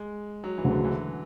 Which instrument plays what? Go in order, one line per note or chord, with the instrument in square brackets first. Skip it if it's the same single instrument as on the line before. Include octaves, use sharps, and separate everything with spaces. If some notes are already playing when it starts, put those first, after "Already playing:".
Already playing: [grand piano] G#3
F#3
E3
[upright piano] D2 C#3 F#3
[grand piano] D3
E3